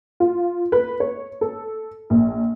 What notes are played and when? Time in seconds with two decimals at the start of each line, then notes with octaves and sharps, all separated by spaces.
0.20 F4
0.72 B4
1.00 C#5
1.41 A4
2.10 A#1